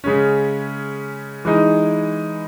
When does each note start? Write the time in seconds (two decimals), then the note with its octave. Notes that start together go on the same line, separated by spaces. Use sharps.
0.04 C#3 G#3 C#4
1.45 E3 G#3 D#4